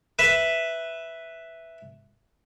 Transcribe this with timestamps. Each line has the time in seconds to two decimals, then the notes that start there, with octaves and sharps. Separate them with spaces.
0.19 B4 E5